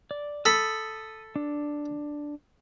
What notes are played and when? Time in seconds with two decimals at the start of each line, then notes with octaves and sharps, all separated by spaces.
0.11 D5
0.45 A4 B5 D#6
1.36 D4